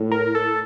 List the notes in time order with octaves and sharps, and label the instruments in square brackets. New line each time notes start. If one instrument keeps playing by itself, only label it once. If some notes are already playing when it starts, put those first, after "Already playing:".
Already playing: [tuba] A2
[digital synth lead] A#4
A4